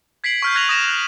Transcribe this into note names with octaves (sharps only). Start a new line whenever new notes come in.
G#6 B6 C7 D7 F#7
C#6 F6 G6
F#6 G#6 A#6 C7 F7 F#7
D#6 G#6 A#6 E7
F#6